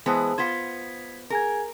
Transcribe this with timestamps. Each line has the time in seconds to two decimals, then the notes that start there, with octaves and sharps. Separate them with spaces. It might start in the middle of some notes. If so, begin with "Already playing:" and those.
0.06 E3 G#3 B3 G#4 C5 A5
0.38 B3 F4 C5 G#6 B6
1.30 G#4 A#4 G#5 G#6